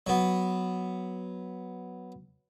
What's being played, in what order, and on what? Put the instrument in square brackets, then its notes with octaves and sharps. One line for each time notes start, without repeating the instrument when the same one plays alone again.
[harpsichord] F#3 B3